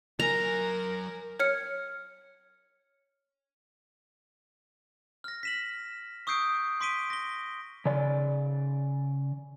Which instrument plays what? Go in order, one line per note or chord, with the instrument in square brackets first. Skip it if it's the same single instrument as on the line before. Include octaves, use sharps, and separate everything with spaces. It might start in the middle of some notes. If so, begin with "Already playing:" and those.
[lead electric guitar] F#3 G#5 [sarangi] A#4 [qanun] A#5
[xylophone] C#5 F6 C#7
[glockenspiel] F6 A#6
B6 E7 F#7
C#6 D#6 E6 G6 C7 D7
C6 D6 B6 D7 D#7 G7
A#6 G7
[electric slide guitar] C#3 D5